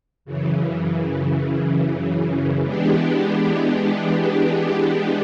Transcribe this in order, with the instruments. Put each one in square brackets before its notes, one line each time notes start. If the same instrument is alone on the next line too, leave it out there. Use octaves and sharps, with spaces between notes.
[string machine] F#2 C#3 E3
E3 G#3 B3 D4 G4